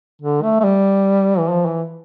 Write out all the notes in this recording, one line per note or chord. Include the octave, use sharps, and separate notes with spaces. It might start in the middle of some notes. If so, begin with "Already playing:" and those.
D3
A3
A3
G3
E3
F3
E3